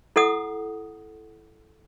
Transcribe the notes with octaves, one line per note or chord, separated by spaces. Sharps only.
E4 A4 F#5 D#6